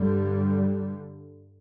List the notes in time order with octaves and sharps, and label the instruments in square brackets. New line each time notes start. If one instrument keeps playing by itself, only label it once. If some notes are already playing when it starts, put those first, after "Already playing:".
Already playing: [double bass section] G2 D3 G3